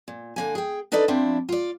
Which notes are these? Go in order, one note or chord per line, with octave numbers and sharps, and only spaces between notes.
A#2
D3 A#3 G#5
G#4 G5
D4 D#4 A4 B4 D5 D#5
F3 C4 D4 E4
F4 D5